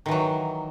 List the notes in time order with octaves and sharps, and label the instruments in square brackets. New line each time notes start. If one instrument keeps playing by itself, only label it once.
[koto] D#3
E3
F#3